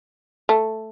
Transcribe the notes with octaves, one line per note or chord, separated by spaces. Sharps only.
A3